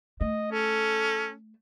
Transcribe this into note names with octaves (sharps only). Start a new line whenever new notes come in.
A3 D#5
C#4 A4